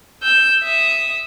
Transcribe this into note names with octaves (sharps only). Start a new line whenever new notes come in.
E6 G6
E5 D#6